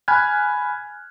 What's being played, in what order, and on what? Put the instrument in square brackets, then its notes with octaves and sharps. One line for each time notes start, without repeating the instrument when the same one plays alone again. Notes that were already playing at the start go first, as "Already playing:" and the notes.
[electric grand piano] G#5 B5 F6 F#6 G#6